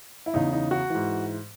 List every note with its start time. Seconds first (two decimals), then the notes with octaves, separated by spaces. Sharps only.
0.26 E4
0.34 E2 C#3 E3 D#4
0.53 D#4
0.71 F#4
0.90 G#2 E3